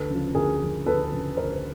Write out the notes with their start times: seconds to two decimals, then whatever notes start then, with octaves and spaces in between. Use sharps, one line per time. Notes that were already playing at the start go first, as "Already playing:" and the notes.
Already playing: D2 A4 B4
0.10 C#3 F3
0.35 D2 G#4 A#4
0.61 C#3 F3
0.86 D2 A4 B4
1.12 C#3 F3
1.37 D2 A#4 C5